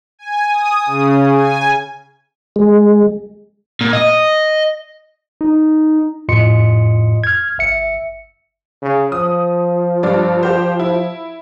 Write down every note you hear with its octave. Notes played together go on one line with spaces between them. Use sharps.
G#5
D#6
C#3
G#5
G#3
A#2
D#5
D#4
F2 A2 F4 D#5 C6 C#7
F6 G#6
G1 E5 C#7
C#3
F3 D#6
G2 D4 D5
G4 C5
E4